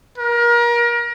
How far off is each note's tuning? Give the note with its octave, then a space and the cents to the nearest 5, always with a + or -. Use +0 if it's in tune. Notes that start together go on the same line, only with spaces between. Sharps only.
A#4 +30